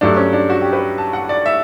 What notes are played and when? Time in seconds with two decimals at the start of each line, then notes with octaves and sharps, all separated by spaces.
0.01 G2 F#3 A3 D4
0.17 C#4
0.33 D4
0.50 F#4
0.62 G4
0.73 B4
0.98 A5
1.13 F#5
1.29 D5
1.46 E5